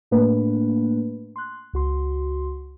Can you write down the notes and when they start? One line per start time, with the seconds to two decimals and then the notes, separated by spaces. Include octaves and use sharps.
0.11 A2 A3 A#3 D4 B4
1.36 C6 F#6
1.73 C#2 F#4 C6